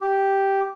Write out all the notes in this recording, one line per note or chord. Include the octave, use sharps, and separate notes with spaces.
G4